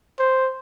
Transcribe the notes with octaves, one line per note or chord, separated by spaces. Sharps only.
C5